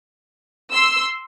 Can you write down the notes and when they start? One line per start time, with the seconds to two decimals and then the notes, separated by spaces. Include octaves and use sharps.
0.73 C6 E6